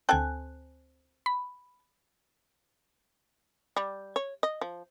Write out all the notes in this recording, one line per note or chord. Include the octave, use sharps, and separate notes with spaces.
D2 C4 A4 G5 G#5 F#6
B5
G3
C#5
D#5
F3